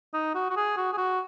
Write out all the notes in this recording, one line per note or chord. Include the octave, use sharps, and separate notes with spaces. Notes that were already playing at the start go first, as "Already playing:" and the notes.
D#4
F#4
F#4
G#4
F#4
G#4
F#4